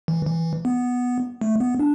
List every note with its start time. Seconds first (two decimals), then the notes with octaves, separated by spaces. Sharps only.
0.08 E3
0.26 E3
0.65 B3
1.41 A3
1.60 B3
1.80 D4